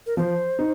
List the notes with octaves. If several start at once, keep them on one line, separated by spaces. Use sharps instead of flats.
A#4
F3 C5
D#4